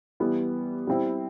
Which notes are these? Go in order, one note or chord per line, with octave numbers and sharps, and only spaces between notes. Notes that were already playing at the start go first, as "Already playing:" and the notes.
E3 G3 B3
G3 C4 E4